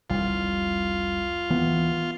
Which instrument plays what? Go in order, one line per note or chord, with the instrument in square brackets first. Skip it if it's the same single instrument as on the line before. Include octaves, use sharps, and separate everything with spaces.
[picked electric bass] F1 C2 G3 [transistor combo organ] F4
[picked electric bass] D1 E3 B3